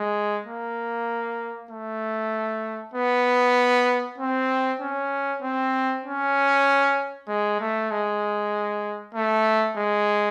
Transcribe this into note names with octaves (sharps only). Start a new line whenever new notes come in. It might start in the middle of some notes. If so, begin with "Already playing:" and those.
Already playing: G#3
A#3
A3
B3
C4
C#4
C4
C#4
G#3
A3
G#3
A3
G#3